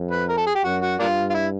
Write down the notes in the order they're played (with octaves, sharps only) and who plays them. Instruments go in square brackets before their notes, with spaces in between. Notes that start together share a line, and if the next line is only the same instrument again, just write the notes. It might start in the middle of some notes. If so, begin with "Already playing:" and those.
Already playing: [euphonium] F2
[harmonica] B4
A#4
A4
G#4
G4
[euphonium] F#2 [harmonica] F#4
[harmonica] F#4
[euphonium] G2 [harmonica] A#3 D4 F4
[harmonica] F4
E4